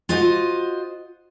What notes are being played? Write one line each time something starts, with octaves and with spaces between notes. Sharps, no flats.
F4 F#4 C5 D#5